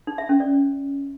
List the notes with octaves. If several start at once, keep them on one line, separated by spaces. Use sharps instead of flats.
D#4
E5
C#4
D5